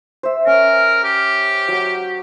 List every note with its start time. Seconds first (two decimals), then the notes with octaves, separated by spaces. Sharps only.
0.23 C5 E5
0.47 C#4 A#4
1.04 G4
1.68 F#3 F#5